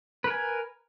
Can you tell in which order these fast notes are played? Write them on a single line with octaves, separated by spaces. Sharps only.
B4 A#4 G#5